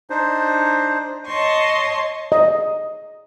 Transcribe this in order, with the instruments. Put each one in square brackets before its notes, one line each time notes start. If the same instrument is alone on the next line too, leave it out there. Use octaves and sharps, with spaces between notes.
[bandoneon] D4 D#4 C5
[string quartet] C#5 D#5 A5 C6 C#6
[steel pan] D#5